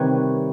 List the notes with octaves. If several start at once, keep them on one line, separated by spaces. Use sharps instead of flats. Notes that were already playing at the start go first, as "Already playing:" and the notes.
Already playing: C3 D#3 G3 B4 C#5